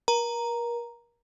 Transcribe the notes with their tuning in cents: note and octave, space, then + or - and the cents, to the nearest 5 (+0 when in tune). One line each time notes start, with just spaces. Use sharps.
A#4 +35 A#5 +0